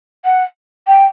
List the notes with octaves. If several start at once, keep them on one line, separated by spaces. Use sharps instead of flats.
F#5
G5